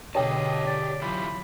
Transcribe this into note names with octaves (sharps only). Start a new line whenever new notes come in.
B2 D3 G4 G#4 C#5 D#5 G5 A5
D5
E3 F#3 F4 G4 B5